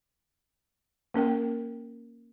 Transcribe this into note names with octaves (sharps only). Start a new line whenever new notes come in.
A#3 C#4 A#4 G5